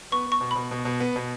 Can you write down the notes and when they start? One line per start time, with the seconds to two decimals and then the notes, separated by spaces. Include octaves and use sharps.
0.12 B3 C#6
0.26 B3
0.32 C#6
0.41 B2
0.51 B2 B5
0.71 B2
0.85 B2
1.00 B3
1.16 B2